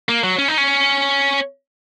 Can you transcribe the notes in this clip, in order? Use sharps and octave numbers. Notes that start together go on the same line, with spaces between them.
A#3
F#3
C#4
D#4
C#4